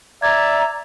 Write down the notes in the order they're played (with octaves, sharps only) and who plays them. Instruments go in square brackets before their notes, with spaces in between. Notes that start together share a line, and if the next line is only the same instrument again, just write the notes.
[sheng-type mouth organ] D5 [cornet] E5 [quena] A#5 [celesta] G#6